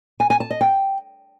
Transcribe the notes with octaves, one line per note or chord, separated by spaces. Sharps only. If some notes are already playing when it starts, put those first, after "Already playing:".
G#5
G#5
A5
D#5
G5